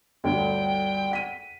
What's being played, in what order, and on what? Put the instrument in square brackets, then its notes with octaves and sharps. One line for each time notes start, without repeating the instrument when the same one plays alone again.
[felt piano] G1 D2 G2 [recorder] G5
[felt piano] F#5 B6 D#7